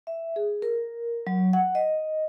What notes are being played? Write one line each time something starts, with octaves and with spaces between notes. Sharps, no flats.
E5
G#4
A#4
F#3
F#5
D#5